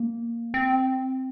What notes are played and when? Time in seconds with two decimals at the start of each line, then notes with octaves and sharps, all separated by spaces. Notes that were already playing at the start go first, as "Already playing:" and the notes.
Already playing: A#3
0.54 C4